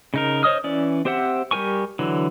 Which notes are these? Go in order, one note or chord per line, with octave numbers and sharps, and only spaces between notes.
C#3 D#4 A#4
C5 C#5 D#5 D#6 F6
E3 C#4 D5
C4 G4 C5 E5 F#5
G3 G4 A#4 G#5 C#6
D3 E3 F#3